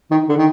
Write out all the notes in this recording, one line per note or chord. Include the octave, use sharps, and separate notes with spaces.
D#3
D3
D#3